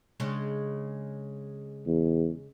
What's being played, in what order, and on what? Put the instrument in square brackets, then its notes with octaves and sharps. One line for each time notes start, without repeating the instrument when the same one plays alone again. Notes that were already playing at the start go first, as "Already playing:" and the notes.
[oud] C#3 G#3 D4
[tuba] E2